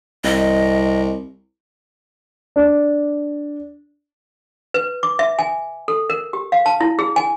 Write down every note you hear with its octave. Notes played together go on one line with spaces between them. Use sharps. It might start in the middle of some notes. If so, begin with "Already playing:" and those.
C2 D#5
D4
B4
D6
E5
G#5
A4
A#4
G4
F5
A5
E4
G#4
G#5